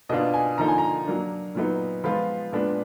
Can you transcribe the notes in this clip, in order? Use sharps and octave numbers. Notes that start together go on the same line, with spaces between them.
B2 A#3 D4 F4 D#5
G#5
D3 F3 A#3 D#4 A#5
G#5
A#5
F#3 A#3 D4
A#2 F#3 B3 D#4
F3 G#3 B3 F4 B5
A#2 G#3 B3 D4